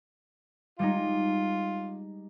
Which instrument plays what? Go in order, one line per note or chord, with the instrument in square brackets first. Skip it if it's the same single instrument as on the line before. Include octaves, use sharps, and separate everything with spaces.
[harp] G3 G#3 D#4 [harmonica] F4